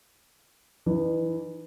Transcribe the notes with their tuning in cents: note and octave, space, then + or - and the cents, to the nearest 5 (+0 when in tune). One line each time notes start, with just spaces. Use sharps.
E3 +0 D#4 -35